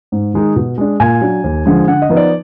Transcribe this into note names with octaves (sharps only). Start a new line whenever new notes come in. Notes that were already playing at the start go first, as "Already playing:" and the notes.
G#2
D#3 G#3 D#4
B2
G#3 D4
A#2 G#5
F#3 D4
D#2
D3 F3 G#3
D3 F#5
D#5
F3 B3 D#4
D5